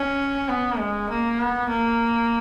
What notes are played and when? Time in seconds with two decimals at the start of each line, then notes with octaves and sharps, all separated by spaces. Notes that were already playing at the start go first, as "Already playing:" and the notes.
Already playing: C#4
0.49 B3
0.79 G#3
1.10 A#3
1.39 B3
1.70 A#3